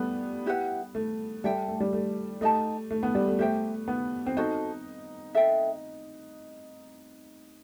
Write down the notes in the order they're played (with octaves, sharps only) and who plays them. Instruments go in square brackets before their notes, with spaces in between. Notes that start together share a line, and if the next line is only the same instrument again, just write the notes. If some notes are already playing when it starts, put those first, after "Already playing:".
Already playing: [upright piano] G3 A3 B3
[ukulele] E4 G4 B4 F#5
[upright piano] A3
[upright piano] G3 [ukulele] A4 E5 G5
[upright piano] A3
G3
A3
[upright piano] A3 [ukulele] D#4 G4 D#5 A5
[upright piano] A3
B3
G3
A3
[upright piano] A3 [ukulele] G4 C5 E5 G5
[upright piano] B3
C4
[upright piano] D#4 [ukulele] F#4 A4 C5
[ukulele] A4 E5 G5